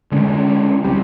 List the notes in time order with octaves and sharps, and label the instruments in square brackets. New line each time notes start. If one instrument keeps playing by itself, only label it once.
[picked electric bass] D3 G#3 C#4
C2 C3 G3